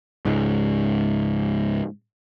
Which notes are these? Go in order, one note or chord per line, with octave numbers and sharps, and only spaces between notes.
C#2 G#2